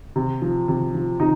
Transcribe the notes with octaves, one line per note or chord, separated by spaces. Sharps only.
C3
F3
C3
F3
C3 D#4